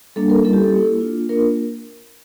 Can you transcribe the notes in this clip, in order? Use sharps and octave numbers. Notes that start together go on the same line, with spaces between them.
G3 A#3 D4 A4
A#4
G3 C#4 E4 A4
G4
A4
A#3 E4
A#3 D4 F4
A#3 D4 F4 A#4